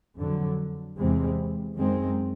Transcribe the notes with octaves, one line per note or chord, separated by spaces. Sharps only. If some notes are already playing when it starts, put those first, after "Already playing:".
F2 D3 F#3
E2 C3 E3 G#3 C4
F#2 D#3 G#3 C4